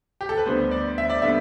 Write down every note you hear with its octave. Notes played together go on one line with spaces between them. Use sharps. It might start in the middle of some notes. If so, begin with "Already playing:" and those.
G4
A4
B4
D2 D3 G3 B3 C5
D5
E5
D5
D3 G3 B3 E5